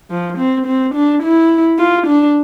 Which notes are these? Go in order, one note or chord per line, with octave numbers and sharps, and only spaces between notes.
F3
C4
C4
D4
E4
F4
D4